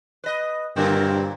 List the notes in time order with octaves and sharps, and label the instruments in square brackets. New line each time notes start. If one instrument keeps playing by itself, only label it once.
[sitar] B4 D#5
[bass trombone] G2 [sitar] A#2 D3 A#3 [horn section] F#3 G3 C4 [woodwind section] A#4